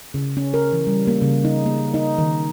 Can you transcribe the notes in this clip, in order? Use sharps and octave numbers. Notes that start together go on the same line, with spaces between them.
C#3
C#4
A#4
E3
G3
A#3
C#3
D#4
A#3
D#4
D#3